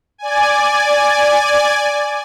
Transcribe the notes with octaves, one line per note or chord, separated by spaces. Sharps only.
D5 G#5